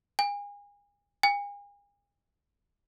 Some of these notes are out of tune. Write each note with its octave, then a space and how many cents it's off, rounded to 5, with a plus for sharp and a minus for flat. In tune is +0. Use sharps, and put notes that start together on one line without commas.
G#5 -35
G#5 -40